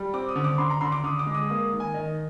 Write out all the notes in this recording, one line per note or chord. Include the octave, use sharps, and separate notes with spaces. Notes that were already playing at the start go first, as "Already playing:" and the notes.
Already playing: G3
C4 D6
D#6
D3
D6
D3 C6
A#5
D3 C6
D6
D3 D#6
D6
G#3
D#6
A#3 D#6
D#3
G#5
D#3 D#5